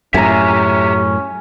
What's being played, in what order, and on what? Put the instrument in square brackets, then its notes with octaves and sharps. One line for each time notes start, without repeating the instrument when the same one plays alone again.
[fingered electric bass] F#2 A2 [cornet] C#4 [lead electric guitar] G4 E5 [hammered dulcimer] G#5 A#5